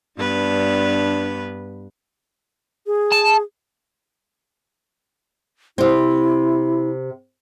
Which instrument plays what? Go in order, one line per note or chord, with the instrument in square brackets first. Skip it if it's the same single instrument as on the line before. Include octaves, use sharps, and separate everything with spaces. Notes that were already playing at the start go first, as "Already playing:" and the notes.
[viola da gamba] G2 B3 B4 [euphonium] D4
[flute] G#4
[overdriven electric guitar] A5
[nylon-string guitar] C3 C4 [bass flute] E4